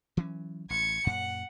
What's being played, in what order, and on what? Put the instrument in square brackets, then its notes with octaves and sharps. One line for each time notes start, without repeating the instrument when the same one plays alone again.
[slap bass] E3 F#3 C#4
[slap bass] A1 [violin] G#6 C#7
[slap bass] F#2 A#2 [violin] F#5